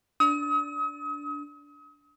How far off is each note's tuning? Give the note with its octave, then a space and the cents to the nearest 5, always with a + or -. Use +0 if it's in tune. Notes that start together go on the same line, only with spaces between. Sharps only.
D4 -15 D#6 +40